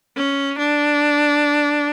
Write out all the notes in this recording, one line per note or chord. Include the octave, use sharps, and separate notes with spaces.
C#4
D4